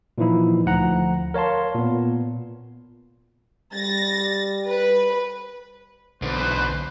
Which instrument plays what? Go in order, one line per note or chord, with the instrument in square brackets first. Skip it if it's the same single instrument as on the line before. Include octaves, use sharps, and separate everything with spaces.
[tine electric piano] A#2 E3 F3 D#4 E4
D2 F3 F#5 A#5
A#4 C#5 F5 A5 C6
A#2 B3
[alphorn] G3 [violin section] A6 A#6
[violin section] B4
[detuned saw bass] B1 [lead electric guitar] E2 D3 [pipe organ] B4 C5